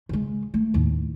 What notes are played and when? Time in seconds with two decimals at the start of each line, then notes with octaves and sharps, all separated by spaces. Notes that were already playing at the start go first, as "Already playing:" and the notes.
0.09 C#3 G#3
0.54 A3
0.74 D#2 A2